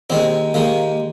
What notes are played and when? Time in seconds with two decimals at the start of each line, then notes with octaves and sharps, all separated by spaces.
0.10 D#2 D#3 G#3 C4
0.54 D#2 D#3 G#3 A#3